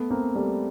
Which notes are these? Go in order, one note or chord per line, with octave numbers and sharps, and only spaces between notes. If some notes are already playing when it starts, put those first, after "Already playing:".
Already playing: A3 B3
A#3 C4
G3 A3